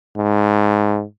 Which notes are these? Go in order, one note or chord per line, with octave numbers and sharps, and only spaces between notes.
G#2